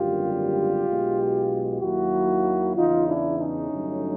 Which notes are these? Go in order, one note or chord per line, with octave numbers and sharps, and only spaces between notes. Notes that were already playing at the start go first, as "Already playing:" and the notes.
Already playing: G#1 F#2 D3 G3 A#3 F4 G4
B1 B2 G#3
D#2 D#3 F#3 A#3 E4 F#4
E2 C#3 E3 D#4 F4
D4 E4
C#4 D#4
G2 D3 F#3 A3